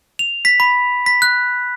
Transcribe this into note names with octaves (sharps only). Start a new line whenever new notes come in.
F7
B6
B5
B6
F#6